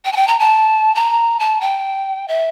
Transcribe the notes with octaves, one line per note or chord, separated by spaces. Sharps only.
G5
A5
G5
A#5
A5
A#5
A5
G5
E5